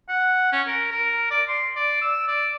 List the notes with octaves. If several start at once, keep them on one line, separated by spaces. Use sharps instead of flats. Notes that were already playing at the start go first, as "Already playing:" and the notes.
F#5
C#4
A#4
A#4
D5
C6
D5
E6
D5